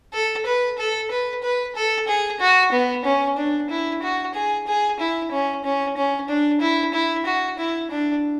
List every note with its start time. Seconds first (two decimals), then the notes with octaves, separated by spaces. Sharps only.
0.13 A4
0.46 B4
0.78 A4
1.11 B4
1.43 B4
1.76 A4
2.08 G#4
2.40 F#4
2.72 B3
3.05 C#4
3.38 D4
3.70 E4
4.02 F#4
4.34 G#4
4.67 G#4
5.00 E4
5.31 C#4
5.64 C#4
5.97 C#4
6.29 D4
6.61 E4
6.94 E4
7.26 F#4
7.58 E4
7.91 D4